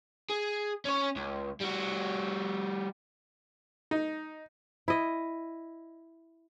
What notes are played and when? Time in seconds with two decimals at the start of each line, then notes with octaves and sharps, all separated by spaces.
0.29 G#4
0.85 C#4 C#5
1.16 C#2
1.61 G3 F#4
3.91 D#4
4.88 E4 D#5